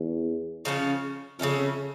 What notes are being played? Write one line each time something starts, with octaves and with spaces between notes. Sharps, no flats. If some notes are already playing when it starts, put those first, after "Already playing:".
Already playing: E2
C#3 F3 A3 C#4
F2 C#3 F3 A3 C#4